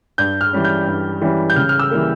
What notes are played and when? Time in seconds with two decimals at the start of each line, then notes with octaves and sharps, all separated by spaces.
0.18 G2 G6
0.41 F6
0.53 E3 G3 C#4
0.64 G6
0.87 G2
1.21 E3 G3 C#4
1.50 G6
1.56 C#3 F6
1.69 F6
1.79 E6
1.91 E3 G3 A#3